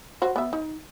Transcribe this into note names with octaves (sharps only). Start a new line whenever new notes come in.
F#4 C5
B3 E5
D#4